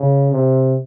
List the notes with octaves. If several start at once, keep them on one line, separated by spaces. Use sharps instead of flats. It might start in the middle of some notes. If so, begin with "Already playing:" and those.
Already playing: C#3
C3